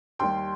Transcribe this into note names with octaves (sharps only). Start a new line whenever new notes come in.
D#2 D#3 G3 G5 C6